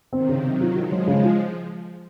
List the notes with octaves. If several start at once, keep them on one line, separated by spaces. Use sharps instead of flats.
C3 D#3 C4
C#3
D#3 F#3 C4
F4
F3 G#3 F4
F#3
C#3
F4